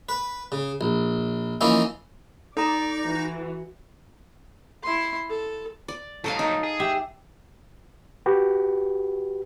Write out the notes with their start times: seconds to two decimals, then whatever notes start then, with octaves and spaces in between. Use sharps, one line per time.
0.09 B4
0.52 C#3
0.81 A#1
1.61 E3 F3 A#3 C#4 D#4 E4
2.57 D#4 A4 D5 A#5 A#6
3.07 E3 F#4
4.83 E4 C6
5.30 A4
5.88 D5
6.24 G#2 F#3 A4 D#5 F5
6.39 D#4
6.64 G#4
6.80 G4 E5
8.26 F#4 G4 B4